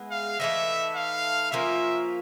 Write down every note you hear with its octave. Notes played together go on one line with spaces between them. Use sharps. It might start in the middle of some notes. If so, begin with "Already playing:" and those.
Already playing: G#3 B3 E4
F5
E3 A3 C4 D#4 E5
F5
F3 A#3 C#4 F4 E5